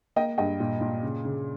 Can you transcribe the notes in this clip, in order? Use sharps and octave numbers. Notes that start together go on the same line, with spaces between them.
A#3 D#5 G5
G2 D#5 G5
A#2
A#2
C#3
C#3